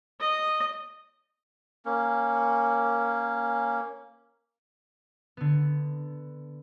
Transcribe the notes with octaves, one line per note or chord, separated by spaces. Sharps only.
D#5
A#3 C#4
D3 B3